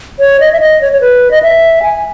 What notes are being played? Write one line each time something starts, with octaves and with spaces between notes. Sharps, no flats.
C#5
D#5
E5
D#5
C#5
C#5
B4
D#5
E5
G#5